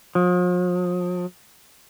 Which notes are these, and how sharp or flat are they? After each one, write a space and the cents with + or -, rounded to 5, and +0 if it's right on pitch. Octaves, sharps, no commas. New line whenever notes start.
F3 +40